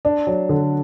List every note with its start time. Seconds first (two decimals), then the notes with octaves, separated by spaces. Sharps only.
0.05 D4
0.27 F#3
0.49 D3